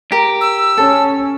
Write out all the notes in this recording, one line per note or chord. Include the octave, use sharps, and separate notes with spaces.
G4 A#4
E6
C#4 A4